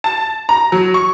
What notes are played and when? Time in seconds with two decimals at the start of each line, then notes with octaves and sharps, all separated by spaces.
0.04 A5
0.49 A#5
0.72 F#3
0.94 C#6